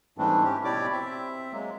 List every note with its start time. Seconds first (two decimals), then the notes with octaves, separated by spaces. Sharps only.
0.18 G#2 E3 G3 A3 C4 D4
0.44 C#4 G4
0.64 B2 E4 G4 C#5 D5 D6
0.92 C4 E5
1.53 F#3 G#3 A#3